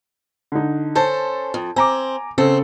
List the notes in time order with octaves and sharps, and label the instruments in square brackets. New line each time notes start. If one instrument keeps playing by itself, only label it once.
[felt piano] D3 D#4
[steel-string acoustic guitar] C#4 A4 C5 [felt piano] A5
[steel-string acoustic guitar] F2
[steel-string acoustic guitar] C4 [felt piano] G#5 A#5 D6
[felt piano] C#3 A4 [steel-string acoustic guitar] C4